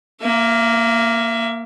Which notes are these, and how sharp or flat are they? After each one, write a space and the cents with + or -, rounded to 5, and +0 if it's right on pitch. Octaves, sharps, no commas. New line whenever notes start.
A#3 +0 E5 +30